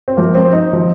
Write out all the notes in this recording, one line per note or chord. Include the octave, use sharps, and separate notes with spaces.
C4
F#2 F3 A#3
C4
D#4
F3